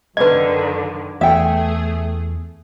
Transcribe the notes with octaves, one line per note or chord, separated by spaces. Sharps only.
F#2 D3 D#3 B4 D#5 G#6
E2 A3 G#4 E5 G5